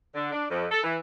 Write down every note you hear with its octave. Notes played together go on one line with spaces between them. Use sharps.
D3
D4
F2
A4
E3